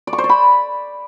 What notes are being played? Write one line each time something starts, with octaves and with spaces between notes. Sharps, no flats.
D5
C#6
C5
D5
B5